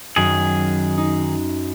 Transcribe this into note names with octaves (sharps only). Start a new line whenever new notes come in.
F#2 D#3 G#4
D#4